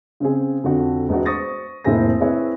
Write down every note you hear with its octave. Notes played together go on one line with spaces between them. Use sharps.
C#3 C4 G#4
F2 D3 F#4
E1 B3 F#4
C5 C#6 D#6 A6 A#6
F1 A2 A#3 C4 G#4 A#6
C4 E4 G#4 B4 C#5